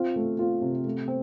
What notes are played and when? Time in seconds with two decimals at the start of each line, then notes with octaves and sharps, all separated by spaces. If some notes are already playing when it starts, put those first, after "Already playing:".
Already playing: C4 F4
0.16 A3
0.39 C4 F4
0.62 C3
0.85 A3
1.08 C4